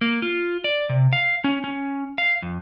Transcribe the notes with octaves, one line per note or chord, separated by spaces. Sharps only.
A#3
F4
D5
C3
F5
C#4
C#4
F5
F2